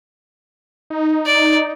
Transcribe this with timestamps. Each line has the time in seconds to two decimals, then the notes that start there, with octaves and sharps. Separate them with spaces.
0.90 D#4
1.26 D5